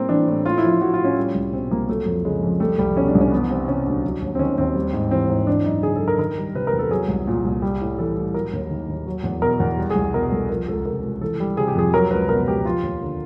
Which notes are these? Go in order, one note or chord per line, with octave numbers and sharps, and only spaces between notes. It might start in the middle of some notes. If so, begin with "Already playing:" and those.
Already playing: A2 G3 A#3 C4
E3 D4
A2
A2 F4
E4
F3 F4
F3 F#4
F4
A2
C#4
G3
C2
B2 C4
C2 A#3
F#3 A3
F2
C#3 G#3
F2
G3 A3
C2 G3
B2 C#4
D4
C2
C#4
E3 B3
G3 C4
C3 C#4
D2 D4
F#3
D#2
C4
D#3 C#4
D#2 C4
G3
G#2
E3 C4
G#2
E3 D4
F#2 D#4
C#3 G#4
A4
F#2
A#4
D#3 A#4
G3
C3 B4
A#4
E2
A4
F#3 G#4
C2
A#2
C2
G3
A2
E3 A4
A2
F#3 A#4
D#2
D#3
D#2
F#3
E2
B2 A#4
E2
G3
G#4
C2
B2 A#4
C2 A4
F3 A#4
C#2 A4
C3 A#4
C#2
E3 A4
G3
C3 G#4
G4
F2 G#4
F#3 A#4
C#2 B4
B2 A#4
C#2 G4
F3 F4
D#2
D3